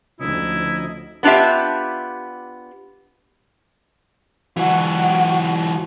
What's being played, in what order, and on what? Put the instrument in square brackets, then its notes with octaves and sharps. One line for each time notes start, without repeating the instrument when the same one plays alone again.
[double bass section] D2 [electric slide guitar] D3 C#4 [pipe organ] F3 D#4 D#5 [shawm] E4
[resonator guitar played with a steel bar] B3 D4 F4 G4 E5
[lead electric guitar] E3 F#3 [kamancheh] F#4 F#5